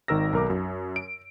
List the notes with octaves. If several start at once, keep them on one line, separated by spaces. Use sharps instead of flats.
G#1 D#3 A#4 E6 A#6
B1 A#4 D6
F#2
D7